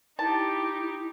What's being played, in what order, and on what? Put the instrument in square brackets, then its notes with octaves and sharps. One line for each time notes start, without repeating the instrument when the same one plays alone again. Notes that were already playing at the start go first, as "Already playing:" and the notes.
[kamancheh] D#4 G4 [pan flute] E4 [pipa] A5